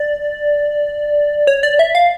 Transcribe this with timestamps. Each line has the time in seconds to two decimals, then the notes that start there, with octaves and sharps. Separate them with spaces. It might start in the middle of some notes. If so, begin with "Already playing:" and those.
Already playing: D5
1.47 C#5
1.63 D5
1.79 E5
1.95 F5